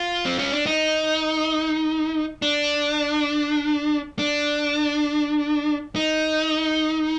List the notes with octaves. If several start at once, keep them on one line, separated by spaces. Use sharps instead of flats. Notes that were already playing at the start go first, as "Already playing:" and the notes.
Already playing: F4
C4
C#4
D4
D#4
D4
D4
D#4